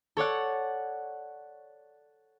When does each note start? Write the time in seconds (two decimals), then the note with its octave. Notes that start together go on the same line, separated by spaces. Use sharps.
0.17 A4 C#5 D5 F#5